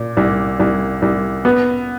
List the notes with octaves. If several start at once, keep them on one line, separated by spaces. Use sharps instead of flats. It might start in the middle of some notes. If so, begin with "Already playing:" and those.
Already playing: A#2
C2
C2
C2
B3